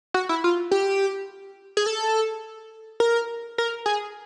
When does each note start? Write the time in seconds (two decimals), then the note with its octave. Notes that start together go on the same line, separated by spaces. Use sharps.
0.14 F#4
0.29 E4
0.44 F4
0.71 G4
1.77 G#4
1.86 A4
3.00 A#4
3.58 A#4
3.86 G#4